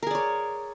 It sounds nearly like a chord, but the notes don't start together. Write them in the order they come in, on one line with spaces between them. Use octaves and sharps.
A#4 G#4 D5 C#5